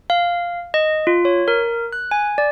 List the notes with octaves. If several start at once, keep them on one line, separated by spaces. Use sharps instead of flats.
F5
D#5
F4
C#5
A#4
F#6
G#5
D5